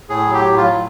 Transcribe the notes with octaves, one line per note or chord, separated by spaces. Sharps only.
A2 G#4
F#3
G4
A2
F4
F#3